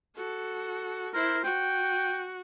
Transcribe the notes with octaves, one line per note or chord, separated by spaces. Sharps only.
F#4 A4
E4 A#4 C5
F#4 G5